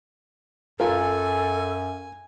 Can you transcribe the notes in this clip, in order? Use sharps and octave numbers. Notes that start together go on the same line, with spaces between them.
F#2 F4 A4 A#4 G#5